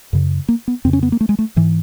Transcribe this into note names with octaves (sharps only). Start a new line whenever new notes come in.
F#2 C#3
A#3
B3
F2 C#3 C4
C#4
B3
A#3
A3
G#3
A3
G#2 E3